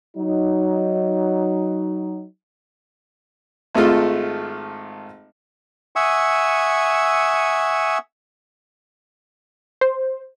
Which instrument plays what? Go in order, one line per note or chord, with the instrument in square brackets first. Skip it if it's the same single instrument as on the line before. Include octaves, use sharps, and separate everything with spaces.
[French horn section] F#3 D#4
[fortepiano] G#1 G#3 A3 F4 A4
[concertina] E5 F#5 G#5 C#6 D#6 E6
[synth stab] C5